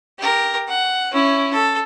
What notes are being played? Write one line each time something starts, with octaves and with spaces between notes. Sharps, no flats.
G4 A#4
F#5
C#4 E4
A4